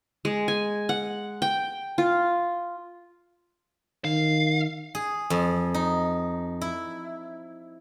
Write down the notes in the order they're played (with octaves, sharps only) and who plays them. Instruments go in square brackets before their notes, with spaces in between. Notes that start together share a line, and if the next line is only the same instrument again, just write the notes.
[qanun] G#3
G#5
F#5
G5
F4
[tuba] D#3 [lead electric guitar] F5
[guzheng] G#4
F2
D#4
E4